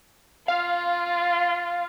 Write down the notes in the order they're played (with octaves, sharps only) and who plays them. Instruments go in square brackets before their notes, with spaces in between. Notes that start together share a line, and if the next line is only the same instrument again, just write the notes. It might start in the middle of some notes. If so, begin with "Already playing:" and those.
[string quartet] F4 [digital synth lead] F5